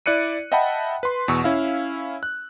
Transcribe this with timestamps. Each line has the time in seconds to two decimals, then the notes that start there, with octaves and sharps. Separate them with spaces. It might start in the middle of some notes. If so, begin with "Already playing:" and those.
0.06 E4 D5 F#6 C#7 D#7
0.52 D#5 E5 F#5 G5 A5 B5
1.03 B4 C6
1.28 E2 B2 C#6 E6
1.44 C#4 E4 F5
2.23 F#6